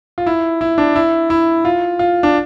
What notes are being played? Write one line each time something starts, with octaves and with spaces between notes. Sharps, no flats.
F4
E4
E4
D4
E4
E4
F4
F4
D4